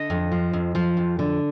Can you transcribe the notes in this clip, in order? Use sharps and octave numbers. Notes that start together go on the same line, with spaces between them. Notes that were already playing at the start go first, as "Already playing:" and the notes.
Already playing: D3 D#5
F2
F3
F2
F3
F2
D3